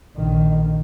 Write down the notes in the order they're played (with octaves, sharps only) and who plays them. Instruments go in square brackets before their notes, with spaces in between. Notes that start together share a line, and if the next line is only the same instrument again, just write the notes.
[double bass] A#1 D#3